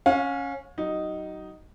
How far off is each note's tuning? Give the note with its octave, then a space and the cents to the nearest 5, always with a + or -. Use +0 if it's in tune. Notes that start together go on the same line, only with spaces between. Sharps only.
C#4 -5 F5 +40
F#3 +35 D#4 +0